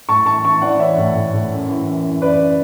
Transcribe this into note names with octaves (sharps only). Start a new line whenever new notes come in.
A2 A5 C#6
E3 A5 C#6
E3 A5 C#6
E3 D5 F#5
E3 C#5 E5
A2
A2
A2
F#2
E3
F#2
E3
F#2 B4 D5
C#3